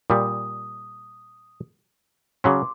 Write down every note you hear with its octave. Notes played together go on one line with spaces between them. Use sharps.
A#2 G3 D#6
C#3 F#3 C#4 C6 D6